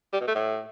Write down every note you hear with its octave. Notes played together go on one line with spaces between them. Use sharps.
G3
B2
A3
A2